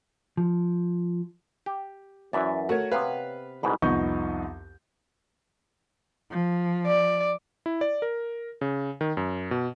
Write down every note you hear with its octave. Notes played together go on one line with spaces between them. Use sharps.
F3
G4
F#2 E3 D5 E5
A3 F#4 A#4 C#5
C3 B3 B4 F5
C2 G#2 B2 B5
C2 F2 B3 D#4 C#6 G6
F3
D5
E4
D5
A#4
C#3
D#3
F#2
B2